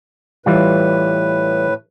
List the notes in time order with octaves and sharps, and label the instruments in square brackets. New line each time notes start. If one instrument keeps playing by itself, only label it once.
[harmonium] A2 B4 [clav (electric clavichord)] E3 G3 F4